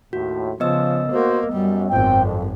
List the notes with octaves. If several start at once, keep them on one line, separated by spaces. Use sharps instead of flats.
D#2 A2 F#4
C#3 F3 B3 D#5 E6
A#3 F#4 C5
F#2 G3
G#1 F#2 C4 F4 G5
F2